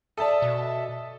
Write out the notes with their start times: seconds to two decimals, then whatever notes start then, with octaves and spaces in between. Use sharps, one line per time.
0.18 A4 D5 E5 A5 D#6
0.42 B2